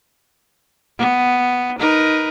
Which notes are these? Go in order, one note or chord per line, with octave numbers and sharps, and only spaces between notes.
B3
D#4 A#4 B4